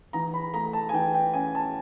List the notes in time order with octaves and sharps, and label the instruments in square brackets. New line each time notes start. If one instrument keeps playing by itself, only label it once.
[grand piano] E3 A#5
B5
A3 A#5
A5
G#5
E3 G5
G5
C#4 G#5
A5